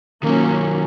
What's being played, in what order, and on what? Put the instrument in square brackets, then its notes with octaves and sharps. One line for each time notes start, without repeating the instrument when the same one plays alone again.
[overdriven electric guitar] D#3 F#3 [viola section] A#3 C#4 F#4